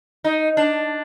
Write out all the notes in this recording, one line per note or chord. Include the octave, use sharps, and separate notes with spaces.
D#4
D4